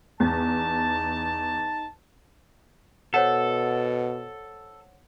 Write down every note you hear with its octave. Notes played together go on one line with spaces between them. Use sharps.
E2 D#4 A5
B2 A4 C5 C#5 F#5